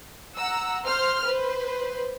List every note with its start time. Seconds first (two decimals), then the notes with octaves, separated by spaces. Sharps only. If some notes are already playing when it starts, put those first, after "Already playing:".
0.38 F#5 A#5 E6
0.86 C5 C6 F6
1.25 B4 C5